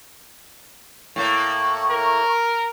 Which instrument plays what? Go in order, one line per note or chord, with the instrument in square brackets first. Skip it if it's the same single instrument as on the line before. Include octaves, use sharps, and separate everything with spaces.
[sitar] A2 A#3 [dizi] C#6
[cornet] A#4